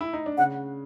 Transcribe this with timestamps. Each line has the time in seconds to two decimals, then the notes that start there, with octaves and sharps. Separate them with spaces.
0.01 E4
0.13 D#4
0.26 D4
0.38 C#3 F#5